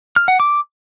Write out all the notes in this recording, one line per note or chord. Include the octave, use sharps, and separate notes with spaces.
F6
F#5
D6